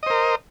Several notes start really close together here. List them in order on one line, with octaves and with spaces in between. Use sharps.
D#5 C5 A#4